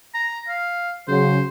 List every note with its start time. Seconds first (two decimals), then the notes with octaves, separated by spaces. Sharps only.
0.14 A#5
0.48 F5
1.08 C#3 F#3 C5